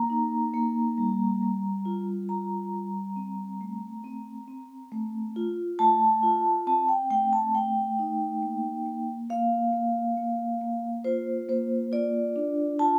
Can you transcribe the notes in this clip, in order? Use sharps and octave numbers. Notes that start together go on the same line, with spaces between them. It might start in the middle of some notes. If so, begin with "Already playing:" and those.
Already playing: A#3 A#5
D#4
A#3
G3
G3
F4
G3 A#5
G3
C4
A3
C4
C4
A3
F4
A3 A5
F4
C4 A5
G5
A3 G5
A5
A3 G5
D#4
A#3
A#3
A#3 F5
A#3
A#3
A#3
F4 C5
A#3 C5
F4 D5
D4
F4 A5